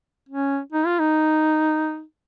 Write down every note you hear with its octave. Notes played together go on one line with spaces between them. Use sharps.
C#4
D#4
F4
D#4